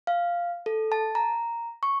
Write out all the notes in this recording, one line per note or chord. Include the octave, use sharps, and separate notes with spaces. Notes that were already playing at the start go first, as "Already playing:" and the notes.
F5
A4
A5
A#5
C#6